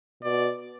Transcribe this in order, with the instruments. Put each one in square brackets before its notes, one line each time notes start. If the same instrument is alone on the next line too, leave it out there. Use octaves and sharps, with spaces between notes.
[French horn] B2 [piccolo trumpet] D5